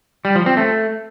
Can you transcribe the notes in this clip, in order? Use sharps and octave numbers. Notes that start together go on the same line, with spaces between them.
G3
F3
C4
A3